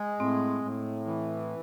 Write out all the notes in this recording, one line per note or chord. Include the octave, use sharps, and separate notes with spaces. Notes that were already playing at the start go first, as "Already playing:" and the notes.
Already playing: G#3
A2 C4
A2
E3